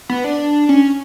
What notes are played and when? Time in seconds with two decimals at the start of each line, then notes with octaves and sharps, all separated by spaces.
0.09 B3
0.24 D4
0.69 C#4